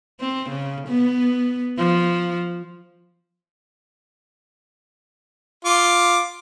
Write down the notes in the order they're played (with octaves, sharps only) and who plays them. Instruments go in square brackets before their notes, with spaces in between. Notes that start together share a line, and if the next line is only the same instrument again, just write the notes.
[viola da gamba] C4
C#3
B3
F3
[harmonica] F4 D6